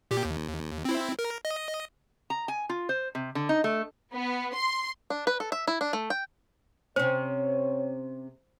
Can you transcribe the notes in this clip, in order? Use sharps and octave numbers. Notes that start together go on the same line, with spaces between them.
A#2 G4
D#2
C4 E4
A#4
D#5
A#5
G#5
F4
C5
C3
D3
D#4
A3
B3
C6
D4
B4
A4
E5
E4
D4
A3
G5
C3 C#4 C5 C#5